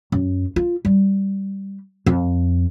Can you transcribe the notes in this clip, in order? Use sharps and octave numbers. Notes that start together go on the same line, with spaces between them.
F#2
F4
G3
F2